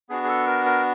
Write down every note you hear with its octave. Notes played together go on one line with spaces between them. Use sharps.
B3 D4 F#4 G#4
G#4
A4
A#4
A#4